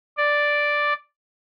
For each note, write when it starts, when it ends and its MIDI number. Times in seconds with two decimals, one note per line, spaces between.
0.17 0.93 74